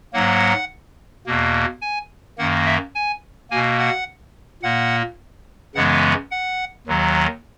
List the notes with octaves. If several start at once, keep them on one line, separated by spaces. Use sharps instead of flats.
G#2 F#3 A#3 F#5
E2 B2 A#3
G#5
F#2 D#3 A#3 F#5
E5
G#5
B2 A#3 G#5
F#5
A#2 A#3 F#5
F#2 C#3 E3 G#3 B3 F#5
F#5
D#2 D#3 F#3